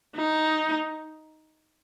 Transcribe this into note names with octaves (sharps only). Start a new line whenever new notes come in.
D#4